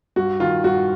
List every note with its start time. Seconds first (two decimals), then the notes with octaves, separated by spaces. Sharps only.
0.16 G2 F#4
0.40 D#3 F4
0.64 G2 F#4